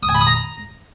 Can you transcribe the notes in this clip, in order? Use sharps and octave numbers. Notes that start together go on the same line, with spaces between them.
D#6
G#5
B5
D#6
A#5